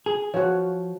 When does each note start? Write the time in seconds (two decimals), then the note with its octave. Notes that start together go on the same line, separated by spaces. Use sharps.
0.06 G#4
0.34 F3 F#4 C#5